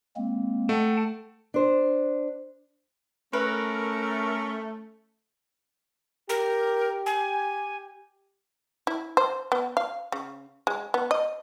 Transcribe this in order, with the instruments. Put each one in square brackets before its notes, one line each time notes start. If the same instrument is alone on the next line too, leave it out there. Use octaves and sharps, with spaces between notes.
[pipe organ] G#3 A#3 C4
[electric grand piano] A3 [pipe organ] F#5 G5 A5
[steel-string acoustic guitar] D4 C5
[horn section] A3 [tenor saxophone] C#4 [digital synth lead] A#4 [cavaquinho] B4
[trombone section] G4 [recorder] A#4
[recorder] G#5
[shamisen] E4
C5
B3
F5
C#3
G#3
B3
D#5